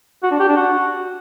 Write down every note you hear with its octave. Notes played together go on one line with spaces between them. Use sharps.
F#4
D4
G4
D4
F#4